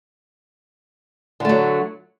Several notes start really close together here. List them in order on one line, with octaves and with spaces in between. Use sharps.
D3 A3 F#3